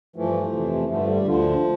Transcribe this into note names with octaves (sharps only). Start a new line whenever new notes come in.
G2 E3 F3 A3
F2 C3 E3
G2 D3 F3 A3
F3
G3
D2 D3 F3